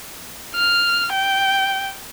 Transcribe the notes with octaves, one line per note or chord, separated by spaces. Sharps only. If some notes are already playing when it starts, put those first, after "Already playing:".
F6
G5